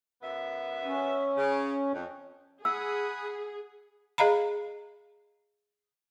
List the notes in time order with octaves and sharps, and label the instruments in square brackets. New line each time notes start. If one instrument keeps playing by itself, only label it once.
[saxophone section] F#2 B3 E5
[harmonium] C#4
[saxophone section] C#3
F2
[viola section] G#4 [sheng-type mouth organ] F#5 B5 D#6 [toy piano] E6
[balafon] G#4 D#5 F5 A#5 B5